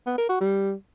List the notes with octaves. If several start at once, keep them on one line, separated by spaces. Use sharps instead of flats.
B3
A#4
F#4
G3